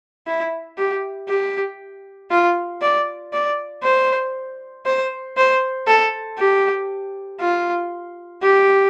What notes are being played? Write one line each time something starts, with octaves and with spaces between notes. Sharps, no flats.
E4
G4
G4
F4
D5
D5
C5
C5
C5
A4
G4
F4
G4